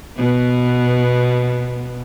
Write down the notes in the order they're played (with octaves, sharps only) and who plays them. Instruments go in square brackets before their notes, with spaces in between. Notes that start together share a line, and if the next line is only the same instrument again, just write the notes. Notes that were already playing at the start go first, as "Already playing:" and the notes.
[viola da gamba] B2 B3